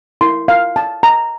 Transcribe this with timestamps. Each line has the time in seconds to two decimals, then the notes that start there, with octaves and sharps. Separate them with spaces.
0.21 E4 A#4 C6
0.48 F5
0.76 A5
1.03 A#5